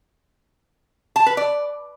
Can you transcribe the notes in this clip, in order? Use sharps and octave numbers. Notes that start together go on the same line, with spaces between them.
A5
B4
D5